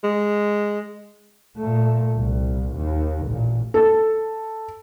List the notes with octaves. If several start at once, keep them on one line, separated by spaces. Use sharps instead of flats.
G#3
A#2 A3
C2
D#2
A1 A#2
A4